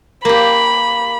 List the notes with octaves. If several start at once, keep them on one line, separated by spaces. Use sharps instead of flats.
A#3 G4 B5